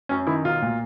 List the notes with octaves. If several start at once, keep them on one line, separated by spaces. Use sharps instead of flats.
F#2 C#4
D#3 E4
B1 F4
A#2